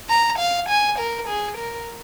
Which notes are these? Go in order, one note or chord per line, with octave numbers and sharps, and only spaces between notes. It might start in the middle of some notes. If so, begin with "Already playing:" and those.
A#5
F5
G#5
A#4
G#4
A#4